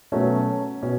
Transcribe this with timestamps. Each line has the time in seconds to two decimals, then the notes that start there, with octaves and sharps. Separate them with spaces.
0.12 B2 F#3 A3 C#4
0.83 B2 C#4